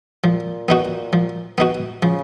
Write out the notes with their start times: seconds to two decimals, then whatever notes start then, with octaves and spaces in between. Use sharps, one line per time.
0.24 A#2 F3
0.69 B3 D#4 F#4
1.13 F3
1.58 B3 D#4 F#4
2.03 C#3 F3